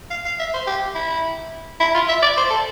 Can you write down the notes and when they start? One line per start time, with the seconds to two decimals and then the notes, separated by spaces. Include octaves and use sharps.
0.11 F5
0.25 F5
0.40 E5
0.54 C5
0.67 G4
0.95 E4
1.81 E4
1.95 F4
2.09 E5
2.23 D5
2.37 C5
2.51 A4